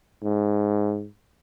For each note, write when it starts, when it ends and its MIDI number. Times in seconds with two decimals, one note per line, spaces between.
0.23 1.06 44